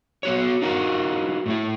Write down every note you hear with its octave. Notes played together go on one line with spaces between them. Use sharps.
B3 F#4 C#5
D#4 F4 F#4 A#4
A2 A3 E4